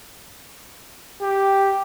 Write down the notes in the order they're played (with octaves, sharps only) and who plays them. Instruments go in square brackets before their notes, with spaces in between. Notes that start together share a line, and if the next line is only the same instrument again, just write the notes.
[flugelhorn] G4